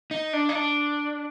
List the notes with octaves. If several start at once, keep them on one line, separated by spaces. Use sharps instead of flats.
D#4
D4
D#4
D4